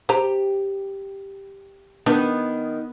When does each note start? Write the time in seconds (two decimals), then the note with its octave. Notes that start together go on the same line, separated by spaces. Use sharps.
0.09 G4 C5 A#5
2.06 D#3 B3 D4